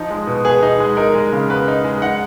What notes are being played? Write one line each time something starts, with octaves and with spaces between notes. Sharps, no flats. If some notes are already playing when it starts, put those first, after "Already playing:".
Already playing: F3 D#4
G#3
B2
B3 G#4
D#4
G#3
D#4 A#4
G#3
C#3
B3 B4
D#4
G#3
D#4 F#5